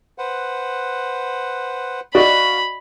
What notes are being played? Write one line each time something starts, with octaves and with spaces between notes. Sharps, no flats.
B4 C5 F#5
F#4 D5 D#5 F5 B5